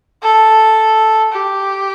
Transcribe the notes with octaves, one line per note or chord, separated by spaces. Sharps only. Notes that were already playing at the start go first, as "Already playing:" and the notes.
A4
G4